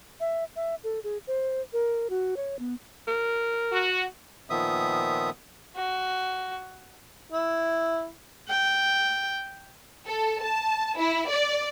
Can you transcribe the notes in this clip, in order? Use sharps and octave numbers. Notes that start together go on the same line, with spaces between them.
E5
E5
A4
G#4
C5
A#4
F#4
C#5
B3
A#4
F#4
A#2 D#3 F3 B3 E5 D#6
F#4
E4
G5
A4
A5
E4
D5